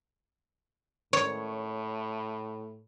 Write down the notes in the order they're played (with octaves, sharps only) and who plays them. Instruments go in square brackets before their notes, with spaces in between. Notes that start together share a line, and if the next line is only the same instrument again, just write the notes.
[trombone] A2 [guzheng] C#5